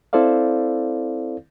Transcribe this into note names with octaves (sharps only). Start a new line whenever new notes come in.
C4 E4 A4 C5 D5 F5